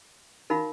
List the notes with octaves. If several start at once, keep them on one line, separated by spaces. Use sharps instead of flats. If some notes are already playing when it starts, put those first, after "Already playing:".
D#4 F#4 A#4 F5 B5